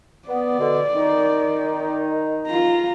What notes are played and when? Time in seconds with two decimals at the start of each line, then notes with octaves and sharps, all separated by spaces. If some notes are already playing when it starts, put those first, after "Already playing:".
0.28 B3 D5
0.59 B2 D3
0.94 D#3 D#4
2.47 F4 A#5